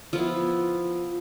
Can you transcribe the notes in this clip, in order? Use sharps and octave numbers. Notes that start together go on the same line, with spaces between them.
F3 B3 E4 F4